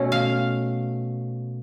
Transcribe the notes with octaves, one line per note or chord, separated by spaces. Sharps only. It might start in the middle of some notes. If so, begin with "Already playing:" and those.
Already playing: B2 A3 C#4
F5